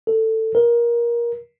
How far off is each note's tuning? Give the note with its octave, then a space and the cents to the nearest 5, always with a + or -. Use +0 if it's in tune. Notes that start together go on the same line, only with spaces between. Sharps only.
A4 +15
A#4 +20